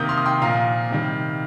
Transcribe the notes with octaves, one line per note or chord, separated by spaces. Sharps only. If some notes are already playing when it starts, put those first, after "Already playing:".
Already playing: C3 D#3 A#3 D#6 G6
C6 F6
D#6
G5 C6
A#2 F3 A#3 F5 A#5
C3 D#3 G3